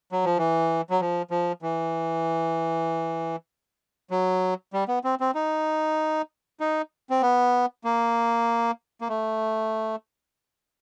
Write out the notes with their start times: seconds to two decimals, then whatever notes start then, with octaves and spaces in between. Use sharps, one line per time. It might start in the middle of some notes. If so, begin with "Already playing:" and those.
0.12 F#3
0.25 F3
0.38 E3
0.90 F#3
1.01 F3
1.31 F3
1.62 E3
4.11 F#3
4.73 G3
4.88 B3
5.04 C4
5.20 C4
5.35 D#4
6.60 D#4
7.10 C4
7.22 B3
7.84 A#3
9.01 A#3
9.09 A3